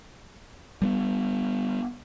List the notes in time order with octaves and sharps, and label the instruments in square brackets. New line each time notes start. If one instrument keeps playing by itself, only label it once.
[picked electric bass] G3 A3 B3